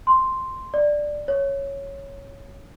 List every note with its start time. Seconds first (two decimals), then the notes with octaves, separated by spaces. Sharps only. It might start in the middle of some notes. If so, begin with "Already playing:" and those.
0.07 C6
0.74 D5
1.28 C#5